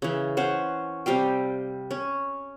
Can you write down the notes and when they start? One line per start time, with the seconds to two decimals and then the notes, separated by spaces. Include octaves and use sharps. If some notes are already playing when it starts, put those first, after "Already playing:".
0.02 C#3 E3
0.37 C#4 C5 F#5
1.06 C3 G3 F5 G5
1.91 C#4